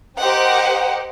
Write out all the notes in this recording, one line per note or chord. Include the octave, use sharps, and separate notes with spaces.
G4 A#4 C5 D#5 F#5 G5